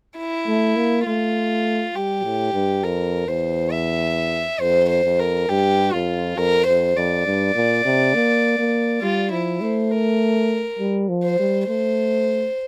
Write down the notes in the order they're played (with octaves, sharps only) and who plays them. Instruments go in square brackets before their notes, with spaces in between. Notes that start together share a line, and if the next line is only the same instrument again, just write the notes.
[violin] E4
[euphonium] A3
A#3
[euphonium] A3 [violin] F4
[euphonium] G3 [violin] G4
[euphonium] A2
G2
[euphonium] F2 [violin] A#4
[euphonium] E2 [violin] C5
[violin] E5
[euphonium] F2 [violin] C5
[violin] C5
[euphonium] F2
[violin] A#4
[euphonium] G2 [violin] G4
[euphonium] F2 [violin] F4
[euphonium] F2 [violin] A#4
[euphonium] F2 [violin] C5
[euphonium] F2 [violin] D5
[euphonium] G2
A#2
C3
A#3
A#3
[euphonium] G3 [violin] F4
[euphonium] F3 [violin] E4
[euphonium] A3 [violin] C5
[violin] A#4
[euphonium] G3
F3
[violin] C5
[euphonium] G3
[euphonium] A3 [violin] C5